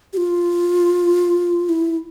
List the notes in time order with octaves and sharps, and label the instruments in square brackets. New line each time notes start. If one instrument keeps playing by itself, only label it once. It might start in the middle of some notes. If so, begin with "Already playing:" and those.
[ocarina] G4
F4
E4